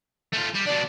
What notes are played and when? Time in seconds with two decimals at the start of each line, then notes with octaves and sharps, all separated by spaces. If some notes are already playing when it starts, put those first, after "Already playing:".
0.33 A3 F4
0.54 G3
0.66 B2 D4 D5